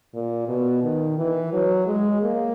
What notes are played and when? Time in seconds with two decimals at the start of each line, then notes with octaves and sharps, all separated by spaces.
0.14 A#2
0.48 B2
0.83 D#3
1.17 E3
1.53 F#3
1.87 G#3
2.22 A#3